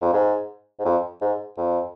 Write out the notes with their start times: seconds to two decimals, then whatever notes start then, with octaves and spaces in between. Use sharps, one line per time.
0.02 F2
0.13 G#2
0.79 G#2
0.85 F2
1.21 G#2
1.57 F2